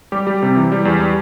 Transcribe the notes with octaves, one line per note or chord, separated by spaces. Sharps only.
G3 G4
G3
C3
E3
G3
E2
G3